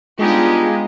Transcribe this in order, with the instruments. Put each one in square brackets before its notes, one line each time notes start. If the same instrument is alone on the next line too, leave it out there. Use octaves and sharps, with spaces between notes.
[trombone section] G3 D4 F4 [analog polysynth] G#3 [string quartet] B3 D#4 G4